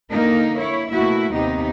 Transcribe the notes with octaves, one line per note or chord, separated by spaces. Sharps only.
D3 A#3 D#4 A#4
E4 C#5
B2 A3 A#3 E4 F#4 E5
D#2 C3 D#3 B3 D#4 G4